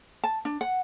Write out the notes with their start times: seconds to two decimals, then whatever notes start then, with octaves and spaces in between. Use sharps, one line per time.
0.24 A5
0.45 D4
0.61 F#5